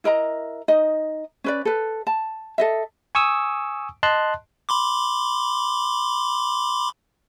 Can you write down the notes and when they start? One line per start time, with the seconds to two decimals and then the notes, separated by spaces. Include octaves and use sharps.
0.04 E4 A#4 D#5 A#5
0.68 D#4 D#5
1.44 C#4 B4 D5
1.65 A4 B4
2.07 A5
2.58 A4 D#5 E5
3.15 G#5 C#6 D#6 E6
4.03 D#5 A5 C6 F#6
4.69 B5 C6 D6